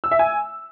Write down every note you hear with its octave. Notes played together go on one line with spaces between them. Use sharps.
E6
E5
G#5